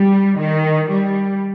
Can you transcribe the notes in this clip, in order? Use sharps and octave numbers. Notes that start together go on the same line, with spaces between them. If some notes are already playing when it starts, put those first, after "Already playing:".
Already playing: G3
D#3
G3